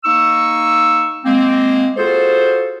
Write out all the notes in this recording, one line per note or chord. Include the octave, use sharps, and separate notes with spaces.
A#3 D#4 C#6 E6
G#3 A#3 C4
F4 F#4 G#4 A4 C5